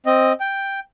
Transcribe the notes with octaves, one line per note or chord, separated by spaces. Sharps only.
C4 D#5
G5